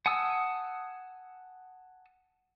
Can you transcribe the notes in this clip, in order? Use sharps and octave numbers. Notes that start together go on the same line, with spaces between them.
F#5 G#5 A5 D#6 E6